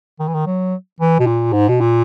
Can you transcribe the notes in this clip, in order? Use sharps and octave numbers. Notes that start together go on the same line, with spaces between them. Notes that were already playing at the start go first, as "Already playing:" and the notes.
D#3
E3
D#3
F#3
E3
B2
A#2
G#2
B2
A#2